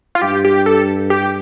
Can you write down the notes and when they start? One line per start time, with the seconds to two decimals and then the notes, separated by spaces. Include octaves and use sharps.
0.15 F4
0.22 G2 G4
0.45 G4
0.66 A4
1.10 G4